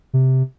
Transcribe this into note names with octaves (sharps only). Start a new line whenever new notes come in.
C3